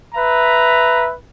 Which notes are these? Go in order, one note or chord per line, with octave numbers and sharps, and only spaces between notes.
B4 E5 A#5